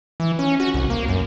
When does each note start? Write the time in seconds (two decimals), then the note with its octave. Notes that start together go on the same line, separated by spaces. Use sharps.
0.20 E3
0.39 C#4
0.60 F#4
0.74 C2
0.90 A#3
1.08 F#2